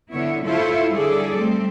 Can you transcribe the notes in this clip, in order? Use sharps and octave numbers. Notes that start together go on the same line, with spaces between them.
D3 B3 E4 C#5
E4 F4 A4 C5 C#5
D3 G3 G#4 A4 D5
G3 A3 C4